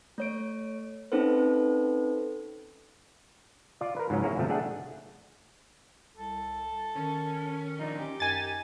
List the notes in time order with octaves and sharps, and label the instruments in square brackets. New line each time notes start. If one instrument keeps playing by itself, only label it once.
[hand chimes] A3 C#5 D7
C4 C#4 D#4 A4 B4 C5
[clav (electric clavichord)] F4 D5
A#4 B4
G#2 C#3 F3 F#3 C#4
A#3 C#4 E4 F#4 G#4 A#4
G1 C3 F3 A3
A3 D4 G#4 F#5 G5
[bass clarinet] C2 [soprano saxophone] A4
[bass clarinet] D#3 [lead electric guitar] C#4
[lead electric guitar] F3 D4 [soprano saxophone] D#4
[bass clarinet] C#4 [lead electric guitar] G4
[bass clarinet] F#2 [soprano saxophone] D#4 [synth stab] G#5 A6